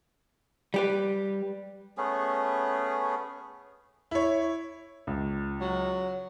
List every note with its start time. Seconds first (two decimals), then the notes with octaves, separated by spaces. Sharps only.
0.74 G3 G4 B4
1.97 A3 B3 C#4 G#4
4.11 E4 C#5
5.07 C#2
5.60 F#3